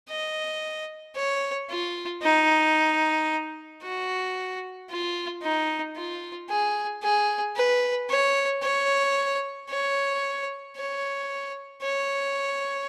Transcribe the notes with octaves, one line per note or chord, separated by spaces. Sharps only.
D#5
C#5
F4
D#4
F#4
F4
D#4
F4
G#4
G#4
B4
C#5
C#5
C#5
C#5
C#5